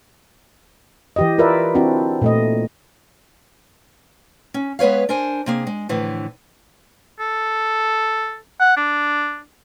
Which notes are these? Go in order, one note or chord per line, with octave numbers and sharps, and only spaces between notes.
E3 G4 D#5
F4 A#4 B4 D5 E5
C4 D4 E4 F#4
A#2 A3 D#5
C#4
G#3 B3 B4 C#5 F5
D4 A#4 C5 G#5
C3 A#3 G#4
G#3
A2 D3 E3 F3
A4
F#5
D4